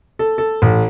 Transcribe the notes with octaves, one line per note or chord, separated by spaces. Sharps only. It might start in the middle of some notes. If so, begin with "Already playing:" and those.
A4
A4
A1